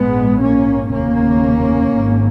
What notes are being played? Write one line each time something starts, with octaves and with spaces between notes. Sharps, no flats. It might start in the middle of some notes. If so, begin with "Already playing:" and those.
Already playing: A#1 G#2 G#3 B3
A#3 C#4
F1 D#2 C#3 A#3 C#4
G#1 G#2